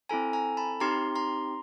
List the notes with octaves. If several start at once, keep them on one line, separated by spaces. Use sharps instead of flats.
C4 E4 A4 G#5 A#5
G#5 A#5
A5 B5
C4 D#4 G4 A#5 C6
A#5 C6